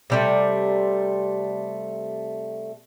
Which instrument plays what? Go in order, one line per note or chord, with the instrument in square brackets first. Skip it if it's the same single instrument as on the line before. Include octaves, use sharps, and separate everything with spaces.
[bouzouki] C3 G3 A3